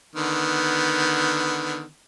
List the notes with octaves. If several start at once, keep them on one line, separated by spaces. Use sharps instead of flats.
D3 D#3 B3